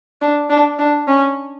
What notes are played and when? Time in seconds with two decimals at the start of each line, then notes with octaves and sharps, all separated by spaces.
0.22 D4
0.50 D4
0.79 D4
1.07 C#4